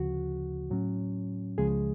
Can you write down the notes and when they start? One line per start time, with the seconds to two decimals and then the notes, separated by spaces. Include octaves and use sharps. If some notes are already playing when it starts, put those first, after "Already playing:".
Already playing: D2 C#3 F3 F#4
0.70 A2 F#3 C#4
1.58 C#2 C#3 F3 G#3 G#4